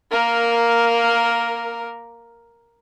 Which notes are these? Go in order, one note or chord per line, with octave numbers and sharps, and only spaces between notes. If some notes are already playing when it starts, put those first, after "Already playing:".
A#3 A#4